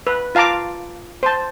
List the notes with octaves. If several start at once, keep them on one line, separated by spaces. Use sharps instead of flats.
B4
F4 F5 A5 A#5 D6
C5 A5